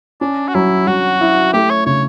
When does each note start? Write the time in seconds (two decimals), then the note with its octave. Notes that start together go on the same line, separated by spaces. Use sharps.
0.21 C#4 D4
0.48 F#4
0.55 F#3 E4
0.87 F#3 F#4
1.21 E4
1.53 A3 G4
1.70 C#5
1.86 C#3 C#5